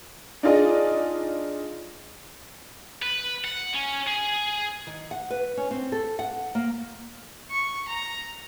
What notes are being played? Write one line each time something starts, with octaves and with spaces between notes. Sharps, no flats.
D4 D#4 F4 G#4 D5 D#5
B4
F#5
C#4
G#4
D#3
F#5
B4
C#4
C4
A4
F#5
A#3
C#6
A#5